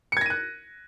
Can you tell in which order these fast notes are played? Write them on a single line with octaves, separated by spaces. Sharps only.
C#7 G#6 A#6 D#7 F#6